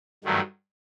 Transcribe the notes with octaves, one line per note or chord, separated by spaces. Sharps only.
G2 D#3 F#3 A3